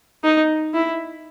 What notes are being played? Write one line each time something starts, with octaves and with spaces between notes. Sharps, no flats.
D#4
E4